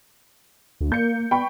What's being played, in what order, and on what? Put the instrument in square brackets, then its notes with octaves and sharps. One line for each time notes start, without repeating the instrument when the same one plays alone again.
[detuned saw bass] D2
[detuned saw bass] A#3 [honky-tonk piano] G6 C#7
[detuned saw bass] B3 [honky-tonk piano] G5 B5 C#6